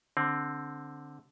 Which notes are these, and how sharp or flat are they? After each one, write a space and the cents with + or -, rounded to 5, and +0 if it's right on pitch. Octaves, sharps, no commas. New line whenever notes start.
D3 +0 C4 +10